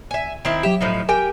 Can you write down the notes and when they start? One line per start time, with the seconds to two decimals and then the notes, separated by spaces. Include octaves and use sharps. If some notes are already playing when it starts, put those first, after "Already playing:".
0.11 E5 G#5
0.45 D#3 C4 E4
0.63 F#3 G4 E5 E7
0.81 A2 F3 D#4
1.09 G4 A#4 G5 G#5